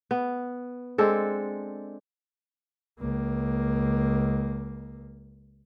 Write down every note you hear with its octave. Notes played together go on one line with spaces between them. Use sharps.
B3
G#3 C4 D4 A4
C#2 A#3